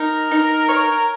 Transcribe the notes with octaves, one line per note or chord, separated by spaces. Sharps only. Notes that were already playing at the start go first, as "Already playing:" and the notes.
Already playing: D#4 A#4
D#4
C#5